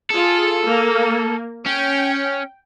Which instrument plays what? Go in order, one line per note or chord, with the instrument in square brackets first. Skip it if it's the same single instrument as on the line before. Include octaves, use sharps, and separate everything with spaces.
[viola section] F4 G#4 [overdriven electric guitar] A4
[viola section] A#3
[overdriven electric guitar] C#4 [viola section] G5